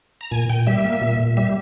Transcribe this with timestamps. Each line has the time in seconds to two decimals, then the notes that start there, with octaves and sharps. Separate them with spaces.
0.21 A#5
0.31 A#2 G#5
0.49 A#2 G5
0.67 G3 E5
0.84 A#3
1.01 A#2
1.20 A#2
1.37 G3 E5